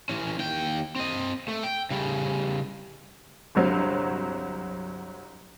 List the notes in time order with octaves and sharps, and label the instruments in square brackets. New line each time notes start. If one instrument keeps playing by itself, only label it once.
[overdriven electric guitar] E3 C#4
D#2 G5
C4 D#5
A3
G5
C#3 G3
[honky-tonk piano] G1 C2 F#3 C4